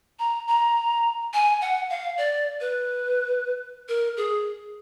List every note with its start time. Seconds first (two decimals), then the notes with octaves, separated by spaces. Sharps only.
0.19 A#5
0.48 A#5
1.33 G#5
1.61 F#5
1.90 F5
2.18 D5
2.61 B4
3.89 A#4
4.17 G#4